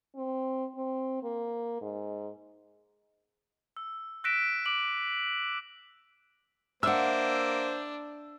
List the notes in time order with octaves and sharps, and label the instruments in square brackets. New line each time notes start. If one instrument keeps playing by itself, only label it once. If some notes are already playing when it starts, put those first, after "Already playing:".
[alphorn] C4
C4
A#3
G#2
[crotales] E6
E6 F#6 A#6 B6 D7 E7
D6 D7 F#7
[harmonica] A#3 C5 [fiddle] D4 [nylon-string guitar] E5 F#5 [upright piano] E6